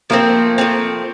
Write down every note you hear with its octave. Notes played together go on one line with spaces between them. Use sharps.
F3 A3 A#3 C4
F3 A3 C4